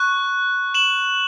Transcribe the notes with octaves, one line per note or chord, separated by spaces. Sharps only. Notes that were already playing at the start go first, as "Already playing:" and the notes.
Already playing: C#6 F#6
E7 F#7